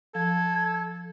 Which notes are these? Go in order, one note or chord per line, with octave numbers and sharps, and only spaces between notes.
F3 A4 G#6